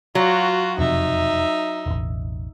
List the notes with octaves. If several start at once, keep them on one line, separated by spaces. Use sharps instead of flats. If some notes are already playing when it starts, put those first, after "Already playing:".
F#3 F4 F#4
E1 F2 C3 D#4 E5
E1 A1